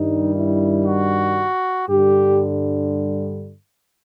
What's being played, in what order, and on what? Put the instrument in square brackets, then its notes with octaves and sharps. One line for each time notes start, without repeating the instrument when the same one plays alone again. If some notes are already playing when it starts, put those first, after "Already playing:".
Already playing: [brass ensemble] G2 D#3 G3 D#4
E4
F#4
G2 D3 G3 G4